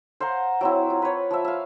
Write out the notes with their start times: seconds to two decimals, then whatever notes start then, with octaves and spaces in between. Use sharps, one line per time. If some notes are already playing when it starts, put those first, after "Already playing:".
0.20 C5 F5 F#5 A#5
0.61 F#3 C4 E4
0.90 F4
1.02 B4 C#5
1.31 F3 E5
1.44 E5 F5